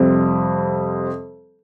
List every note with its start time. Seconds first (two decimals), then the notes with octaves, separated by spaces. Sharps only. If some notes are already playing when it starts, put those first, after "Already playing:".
Already playing: F2 C3 G3 C4